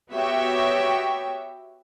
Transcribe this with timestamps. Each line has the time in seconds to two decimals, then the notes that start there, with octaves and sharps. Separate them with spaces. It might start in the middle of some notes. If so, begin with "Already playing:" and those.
0.12 B3 F#4 G4 C#5 E5 G5